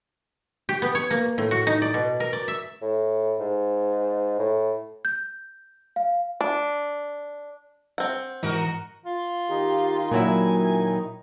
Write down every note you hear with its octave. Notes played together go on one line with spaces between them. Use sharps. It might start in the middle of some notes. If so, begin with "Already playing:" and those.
G4
B3
C#5
A#3
A2
F#4
D#4
D5
B2
A#4
D5
E5
A2
G#2
A2
G6
F5
D4
C4 F#5
G#2 E3 D#4 F#4 A#4
F4
D#3 D#4 G4
A#2 F#3 E4 A#4 G#5